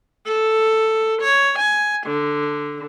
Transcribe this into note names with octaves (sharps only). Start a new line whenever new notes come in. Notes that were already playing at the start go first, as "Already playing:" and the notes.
A4
C#5
G#5
D3